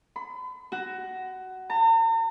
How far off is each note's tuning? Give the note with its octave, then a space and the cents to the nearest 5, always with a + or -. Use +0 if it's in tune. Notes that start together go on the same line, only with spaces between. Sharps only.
B5 +40
F#4 +15
A#5 -45